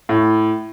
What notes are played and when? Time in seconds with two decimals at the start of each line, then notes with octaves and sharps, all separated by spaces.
0.09 A2